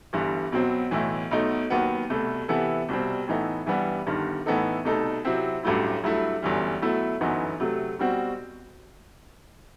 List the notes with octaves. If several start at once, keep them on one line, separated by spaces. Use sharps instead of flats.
G1 G2 E3
B1 B2 F#3 C4
B1 A2 E3
B1 B2 A3 D#4
D#2 D#3 F#3 B3
C2 B2 A3
C3 E3 B3 E4 A4
C2 B2 G3 C4
A2 E3 B3 D#4 A4
G2 E3 G3 B3
G1 G2 D#3
A2 E3 B3 D#4 A4
C2 B2 A3 D#4 A4
C3 F#3 C4 E4
A1 G2 F#3 A3 E4
G2 F#3 A3 E4
G1 F#2 E3 G3
B2 F#3 A3 E4
G1 F#2 E3 B3 D#4
C3 F#3 A3
B2 G3 C4 F#4